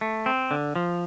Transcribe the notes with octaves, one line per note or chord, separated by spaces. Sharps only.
A3
C4
D3
F3